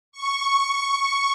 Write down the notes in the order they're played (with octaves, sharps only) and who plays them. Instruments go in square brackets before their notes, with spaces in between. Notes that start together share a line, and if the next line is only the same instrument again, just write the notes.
[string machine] C#6